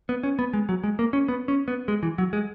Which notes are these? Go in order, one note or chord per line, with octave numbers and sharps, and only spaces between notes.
B3
C#4
B3
G#3
F#3
G#3
A#3
C#4
B3
C#4
B3
G#3
E3
F#3
G#3